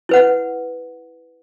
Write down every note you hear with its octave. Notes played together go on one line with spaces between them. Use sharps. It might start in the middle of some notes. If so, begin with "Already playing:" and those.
E4 B4 F#5